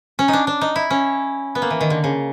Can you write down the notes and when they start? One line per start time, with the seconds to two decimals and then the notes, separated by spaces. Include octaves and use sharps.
0.19 C#4
0.28 D#4
0.33 D4
0.47 D4
0.61 D#4
0.76 E4
0.90 C#4
1.55 B3
1.62 A#3
1.70 E3
1.81 D#3
1.90 D3
2.04 C#3